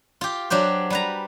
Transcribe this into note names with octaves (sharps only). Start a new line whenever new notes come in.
F4 G4
F#3 D4 G4 C5
G3 B4 A#5